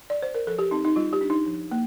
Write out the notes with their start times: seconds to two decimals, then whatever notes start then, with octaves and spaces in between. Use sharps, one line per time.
0.10 D5
0.22 C5
0.35 A#4
0.47 F3 A4
0.59 G4
0.71 C4 D#4
0.85 D#4
0.96 G3 F4
1.13 G4
1.21 D4
1.30 D#4
1.46 F3
1.71 A#3